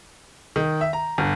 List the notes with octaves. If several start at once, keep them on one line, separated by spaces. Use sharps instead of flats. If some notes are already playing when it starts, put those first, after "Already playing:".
D#3
E5
A#5
G1